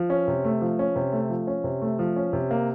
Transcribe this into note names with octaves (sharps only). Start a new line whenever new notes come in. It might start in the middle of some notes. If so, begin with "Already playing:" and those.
Already playing: F3
C#4
C3
A3
F3
C#4
C3
A3
F3
C#4
C3
A3
F3
C#4
C3
A#3